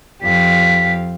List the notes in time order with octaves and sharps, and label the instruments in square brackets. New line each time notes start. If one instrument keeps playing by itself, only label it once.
[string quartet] F2 G4 F5 [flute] B6